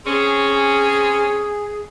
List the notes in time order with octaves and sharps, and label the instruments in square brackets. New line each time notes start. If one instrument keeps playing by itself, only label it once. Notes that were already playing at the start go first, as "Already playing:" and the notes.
[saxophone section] C4 C#4 [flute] G#4